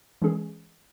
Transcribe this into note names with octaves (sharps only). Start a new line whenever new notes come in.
E3 G#3 C#4 G#4